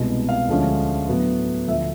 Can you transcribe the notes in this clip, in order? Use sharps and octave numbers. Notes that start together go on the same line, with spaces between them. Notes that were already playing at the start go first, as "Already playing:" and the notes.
Already playing: C2 B2 G#3
F5
D2 D3 F3 G#3 C#4
A2 F#3 B3
D2 D3 F3 E5